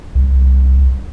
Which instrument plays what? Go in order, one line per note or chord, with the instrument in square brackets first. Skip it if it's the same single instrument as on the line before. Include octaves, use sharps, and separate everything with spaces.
[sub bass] C2